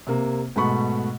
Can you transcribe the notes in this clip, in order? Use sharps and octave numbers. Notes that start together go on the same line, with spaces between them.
C3 A#3
G#2 B2 A3 B5 C#6